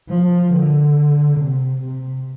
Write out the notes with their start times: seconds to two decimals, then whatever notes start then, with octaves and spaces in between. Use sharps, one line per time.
0.09 F3
0.52 D3
1.38 C3
1.81 C3